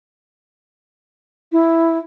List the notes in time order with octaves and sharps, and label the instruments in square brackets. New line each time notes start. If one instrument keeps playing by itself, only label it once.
[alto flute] E4